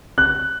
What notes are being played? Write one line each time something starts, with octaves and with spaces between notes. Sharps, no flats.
F#6